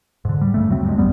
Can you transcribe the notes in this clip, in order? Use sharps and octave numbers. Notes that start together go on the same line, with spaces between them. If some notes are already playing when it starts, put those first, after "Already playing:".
G#2 D3
G3
G2 C#3 A3
D2 F#3 A3 C4
G2 G#3
A#1 F#2 G3 B3